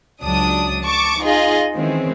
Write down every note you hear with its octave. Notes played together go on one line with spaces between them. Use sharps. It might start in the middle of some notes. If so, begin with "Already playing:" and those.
C#2 F#3 D4 D#6
A5 C#6 D6
D#4 F4 G#4 D#5
D#3 E3 G#3 C4 C#4